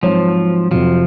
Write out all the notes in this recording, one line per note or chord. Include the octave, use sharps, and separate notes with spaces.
G#2 F3 F#3 C4 F#4 C#5
F2 C3 F3 F#3